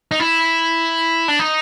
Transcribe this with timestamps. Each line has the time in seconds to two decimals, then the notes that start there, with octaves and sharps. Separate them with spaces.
0.11 D#4
0.19 E4
1.28 D4
1.39 D#4